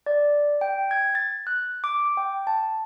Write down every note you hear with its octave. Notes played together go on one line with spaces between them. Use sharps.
D5
G5
G#6
A6
F#6
D6
G5
A5